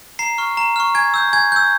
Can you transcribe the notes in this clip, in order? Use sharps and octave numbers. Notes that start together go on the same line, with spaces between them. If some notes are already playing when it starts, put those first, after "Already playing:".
A#5 C7
C#6 F6
A#5
C#6 F6
G#5 G#6
E6 G6
G#5 G#6
E6 G6